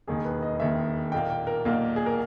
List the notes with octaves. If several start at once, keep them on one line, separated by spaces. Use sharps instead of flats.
E1 D#2 D#3 G#4
B4
D#5
E1 D#2 D#3 E5
B1 A#2 A#3 G5
G5
A#4
B1 A#2 A#3
G#4
A#4